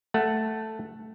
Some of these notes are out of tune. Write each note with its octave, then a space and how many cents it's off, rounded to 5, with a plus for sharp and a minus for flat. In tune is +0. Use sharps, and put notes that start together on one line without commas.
A3 +0 F#5 +0